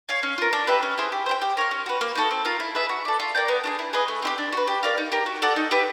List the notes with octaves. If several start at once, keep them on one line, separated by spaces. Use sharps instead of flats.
C#5 F5 G#5
C#4
F4 A#4
D4
G4 B4 E5
C#4
E4 G#4 C5
G4
C5 E5 G5
G4
A#4 C#5 F5
C#4
F#4 B4
A#3
D#4 F#4 A4
C4
F4 A#4
E4
G#4 B4 E5
F#4
A4 D5
F4
A#4 D5 G5
B3
D4 F4 G#4
E4
G#4 B4 D#5
A3
C4 E4 G4
D4
F#4 B4
G4
A#4 D5 F5
D#4
G4 A#4
F#4
A4 D5 F#5
D#4
G4 B4 E5